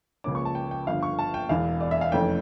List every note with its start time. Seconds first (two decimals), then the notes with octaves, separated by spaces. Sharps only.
0.24 C#2 C#3 F3 A#3 C#4 D6
0.35 C#6
0.45 A5
0.55 G5
0.71 G5
0.87 G1 G2 D3 F3 F5
1.03 C#6
1.19 A5
1.34 G5
1.49 E1 E2 E3 F5
1.81 D5
1.91 E5
2.01 F5
2.12 F1 F2 E3 A3 C#4 G5